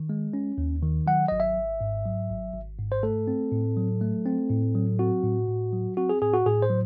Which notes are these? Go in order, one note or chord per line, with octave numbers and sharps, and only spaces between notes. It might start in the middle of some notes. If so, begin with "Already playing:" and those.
Already playing: D#3
G#3
C#4
D#2
D#3
F#3 F#5
G#1 D#5
E5
G#1
G#2
F#3
G#1
G#1
G#2
C5
A3 A4
C4
A2
F#3
A3
C4
A2
F#3
C4 F#4
A2
A2
F#3
C4 F#4
G#4
A2 G#4
F#4
A2 G#4
C5
F#3